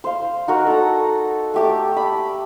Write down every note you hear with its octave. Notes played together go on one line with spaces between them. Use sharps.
C5 F5
D#4 F#4 A#4
A4 A#5
A3 G4 D6
B5